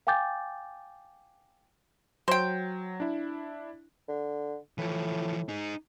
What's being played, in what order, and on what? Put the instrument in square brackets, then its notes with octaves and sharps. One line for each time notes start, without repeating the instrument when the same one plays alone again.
[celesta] F5 G5 G#5 D6 G6 A6
[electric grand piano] F#3 [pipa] C5 G5
[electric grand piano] D4 E4
[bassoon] D3
[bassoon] A2 [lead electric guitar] E3 F3
[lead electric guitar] D#4 G#4